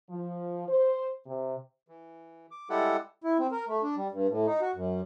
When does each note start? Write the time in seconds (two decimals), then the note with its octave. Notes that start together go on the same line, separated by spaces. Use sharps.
0.10 F3
0.68 C5
1.27 C3
1.88 E3
2.51 D6
2.70 G3 G#3 E4 G4 A4 F#5
3.22 E4
3.39 C4
3.52 A#4
3.68 A3
3.83 D4
3.96 G3
4.12 G2
4.29 A2
4.46 D#4
4.62 F#4
4.75 F#2